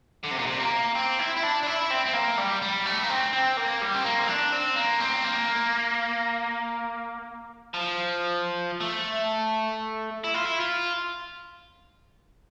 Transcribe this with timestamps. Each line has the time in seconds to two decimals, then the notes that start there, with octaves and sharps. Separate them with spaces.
0.24 D3
0.31 C3
0.39 A#2
0.47 C3
0.59 A#3
0.95 C4
1.19 E4
1.36 E4
1.43 D4
1.63 D4
1.67 E4
1.90 C4
2.06 C4
2.14 A#3
2.38 G3
2.62 G3
2.86 A3
3.04 A#3
3.10 C4
3.33 C4
3.57 A#3
3.82 G3
3.94 C4
4.04 A#3
4.19 C4
4.29 D4
4.52 C4
4.76 A#3
5.00 C4
5.25 A#3
7.74 F3
8.81 A3
10.24 E4
10.34 F4
10.45 E4
10.60 F4